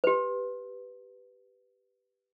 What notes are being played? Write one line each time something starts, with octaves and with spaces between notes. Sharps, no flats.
G4 B4